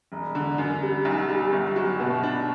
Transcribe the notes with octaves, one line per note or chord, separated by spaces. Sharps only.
E1
D3
F#2
G3
B1
G3
G1
F#3
B2
D4